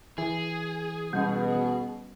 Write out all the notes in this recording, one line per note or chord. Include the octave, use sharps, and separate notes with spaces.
E3 G#4
B2 G3 C#4